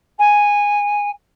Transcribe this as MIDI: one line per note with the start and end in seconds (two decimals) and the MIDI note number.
0.18 1.09 80